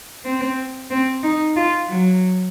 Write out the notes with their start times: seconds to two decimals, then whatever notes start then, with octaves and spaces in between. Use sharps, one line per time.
0.25 C4
0.91 C4
1.23 D#4
1.56 F4
1.88 F#3